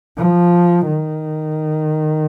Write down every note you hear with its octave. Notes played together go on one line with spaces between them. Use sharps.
F3
D#3